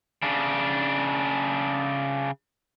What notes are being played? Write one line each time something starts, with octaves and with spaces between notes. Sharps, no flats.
C#3 D4